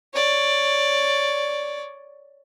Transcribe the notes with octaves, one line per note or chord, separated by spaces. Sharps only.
C#5 D5